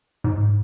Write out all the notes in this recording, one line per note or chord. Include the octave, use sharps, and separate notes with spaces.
G#2